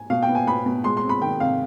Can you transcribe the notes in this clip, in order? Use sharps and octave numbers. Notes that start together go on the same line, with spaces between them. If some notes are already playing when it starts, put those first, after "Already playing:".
Already playing: G#5
B2 F5
G5
B3
G#5
B3 B5
B2
G#3 C6
C6
C4
B5
D#3 G5
C3 F5